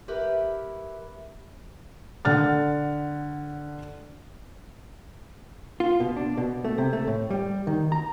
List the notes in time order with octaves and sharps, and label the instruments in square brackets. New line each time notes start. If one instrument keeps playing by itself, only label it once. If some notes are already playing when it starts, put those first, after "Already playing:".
[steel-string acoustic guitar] E4 G4 A#4 B4
[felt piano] D3 F#5 F6 A6
[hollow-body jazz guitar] F4
B2
D4
B2
A3
C3
A3
A2
G3
D#3
A#5